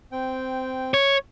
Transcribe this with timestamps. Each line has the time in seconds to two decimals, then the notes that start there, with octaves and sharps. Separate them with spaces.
0.12 C4 G5
0.94 C#5